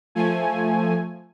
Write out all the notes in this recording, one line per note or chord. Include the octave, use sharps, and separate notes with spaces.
F3 A3 G#5